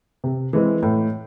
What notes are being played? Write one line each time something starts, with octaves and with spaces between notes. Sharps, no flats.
C3
E3 G#3 C4
A2